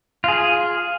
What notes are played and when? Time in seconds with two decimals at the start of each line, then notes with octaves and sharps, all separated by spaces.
0.24 F4 G#4